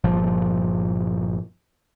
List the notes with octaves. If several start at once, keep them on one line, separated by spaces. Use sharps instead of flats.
G1 A#2 F3